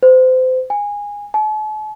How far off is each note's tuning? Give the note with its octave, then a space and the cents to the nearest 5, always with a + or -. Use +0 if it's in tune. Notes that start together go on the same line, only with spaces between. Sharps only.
C5 -30
G#5 -15
A5 -45